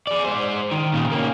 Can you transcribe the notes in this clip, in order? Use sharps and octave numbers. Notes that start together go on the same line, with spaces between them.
G#4 D5
G#3 C5
D#3
A#2 C#3
A#3 C#4